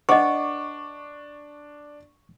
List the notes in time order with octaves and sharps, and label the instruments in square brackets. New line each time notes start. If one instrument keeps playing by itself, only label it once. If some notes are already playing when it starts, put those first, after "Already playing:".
[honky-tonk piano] D4 D6 [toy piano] B4 D#5 [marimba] F#5 [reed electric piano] C#6